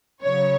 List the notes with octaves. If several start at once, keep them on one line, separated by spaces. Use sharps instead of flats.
C#3 F#3 C#5